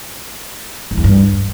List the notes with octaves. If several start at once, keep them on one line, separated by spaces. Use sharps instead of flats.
E3
E2
G2